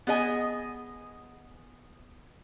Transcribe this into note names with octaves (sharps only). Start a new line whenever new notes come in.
B3 G#4 D#5 G#5